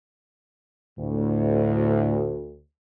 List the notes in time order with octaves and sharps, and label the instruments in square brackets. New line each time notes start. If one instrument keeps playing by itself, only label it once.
[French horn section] D2 [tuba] A2